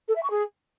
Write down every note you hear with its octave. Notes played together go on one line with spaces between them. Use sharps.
A4
E5
C#6
G#4